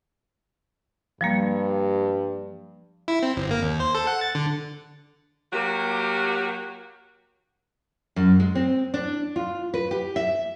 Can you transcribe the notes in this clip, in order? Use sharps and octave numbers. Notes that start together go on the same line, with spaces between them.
G2 F3 G3 A#3
E4
C4
G1
A#3
D#2
C5
A4
F#5
A6
D3
F#3 A#3 F#4 G4
F#2
G#3
C4
D4
F4
B4
G4
E5